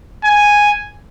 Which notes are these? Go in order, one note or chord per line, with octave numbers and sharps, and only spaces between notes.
G#5